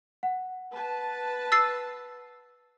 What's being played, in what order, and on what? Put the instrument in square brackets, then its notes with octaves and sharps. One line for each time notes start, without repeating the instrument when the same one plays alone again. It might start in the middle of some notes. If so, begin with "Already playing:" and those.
[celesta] F#5
[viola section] B4 A5
[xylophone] E6 A6 C7